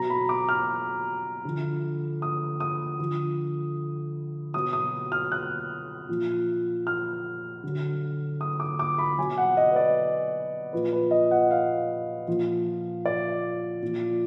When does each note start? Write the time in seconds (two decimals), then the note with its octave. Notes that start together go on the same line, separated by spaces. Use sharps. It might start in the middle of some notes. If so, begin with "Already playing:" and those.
Already playing: B2 F#3 A#5
0.10 B5
0.29 D6
0.49 F6
1.45 D3 F3
2.22 D#6
2.60 D#6
2.99 D3 F3
4.54 B2 F#3 D#6
4.73 D#6
5.12 F6
5.32 F#6
6.09 A#2 F3
6.87 F6
7.64 D3 F#3
8.41 D#6
8.60 D6
8.79 D6
8.98 B5
9.18 B2 F#3 G#5
9.38 F#5
9.57 D#5
9.71 B4
9.76 D5
10.73 A#2 F3 B4
10.92 B4
11.11 D#5
11.31 F#5
11.51 F5
12.28 A#2 F3
13.06 D5
13.82 A#2 F3